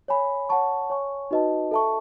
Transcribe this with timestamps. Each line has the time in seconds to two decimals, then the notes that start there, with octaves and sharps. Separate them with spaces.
0.08 C#5 G#5 B5
0.49 C#5 F#5 A5 C#6
0.90 C#5 G#5 C#6
1.31 D#4 F#4 B4 D#5 A5
1.71 A4 E5 A5 C#6